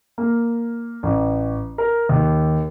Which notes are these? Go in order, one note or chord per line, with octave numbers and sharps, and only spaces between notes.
A#3
A1
A#4
D#2